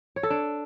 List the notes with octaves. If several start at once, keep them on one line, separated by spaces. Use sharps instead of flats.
C#5
A4
D4